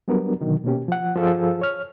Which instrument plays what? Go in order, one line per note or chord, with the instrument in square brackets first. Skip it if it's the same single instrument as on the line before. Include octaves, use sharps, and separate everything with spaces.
[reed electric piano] F#3 G3 B3 D4 A#4
B2 D3 D#3 F#3
B2 A#3 C#4 G4
F3 F#5
G2 F3 G#4 A4 F5 E6
C#5 F6